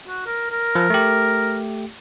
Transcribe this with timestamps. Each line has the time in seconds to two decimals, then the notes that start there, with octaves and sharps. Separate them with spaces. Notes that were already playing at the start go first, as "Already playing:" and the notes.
0.08 F#4
0.26 A#4
0.50 A#4
0.75 F3
0.90 A3 G4